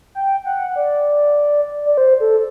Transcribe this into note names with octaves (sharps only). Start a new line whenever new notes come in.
G5
F#5
D5
D5
C5
A4